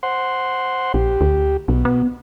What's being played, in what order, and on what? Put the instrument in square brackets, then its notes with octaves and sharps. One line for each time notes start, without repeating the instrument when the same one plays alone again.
[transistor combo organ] C5 F#5 C6
[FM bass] A#1 [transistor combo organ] G4
[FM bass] D2
[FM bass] B1 [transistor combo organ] B2
[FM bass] B3